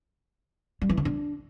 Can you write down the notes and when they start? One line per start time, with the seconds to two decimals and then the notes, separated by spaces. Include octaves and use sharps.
0.82 G3
0.89 E3
0.97 D3
1.05 D4